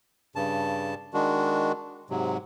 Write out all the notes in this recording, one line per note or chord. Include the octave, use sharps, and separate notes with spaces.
G2 C#3 A5
D#3 G#3 D4 F#4
G#2 C3 F#3